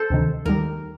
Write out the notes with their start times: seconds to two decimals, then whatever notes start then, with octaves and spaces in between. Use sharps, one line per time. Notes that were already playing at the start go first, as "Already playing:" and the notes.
Already playing: A4 C5
0.10 D2 C3 D#3
0.45 D#2 D#3 G3 A#4